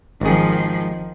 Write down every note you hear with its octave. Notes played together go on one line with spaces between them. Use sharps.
G#1 D#3 F3 G#4